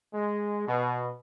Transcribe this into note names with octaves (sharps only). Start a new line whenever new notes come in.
G#3
B2